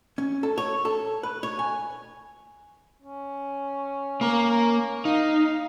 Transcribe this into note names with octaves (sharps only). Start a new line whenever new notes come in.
C#4
A4
C#5
A4
B4
C#5
G#5
C#4
A#3 A#4
D#4 F5